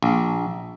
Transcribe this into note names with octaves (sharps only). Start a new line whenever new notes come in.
A#1